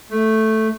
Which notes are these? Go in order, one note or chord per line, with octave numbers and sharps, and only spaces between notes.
A3